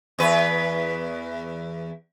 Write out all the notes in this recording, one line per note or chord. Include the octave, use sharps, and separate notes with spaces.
E2 B4